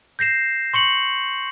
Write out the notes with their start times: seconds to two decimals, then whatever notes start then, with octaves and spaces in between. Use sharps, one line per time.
0.19 G6 A#6 C7 E7
0.74 C6 C#6 C#7 F#7